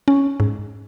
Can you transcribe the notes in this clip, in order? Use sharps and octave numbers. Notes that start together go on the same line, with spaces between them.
C#4
G#2